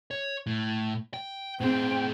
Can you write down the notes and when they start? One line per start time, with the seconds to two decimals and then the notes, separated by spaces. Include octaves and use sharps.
0.11 C#5
0.47 A2
1.14 G5
1.61 A2 C4 G#4 G5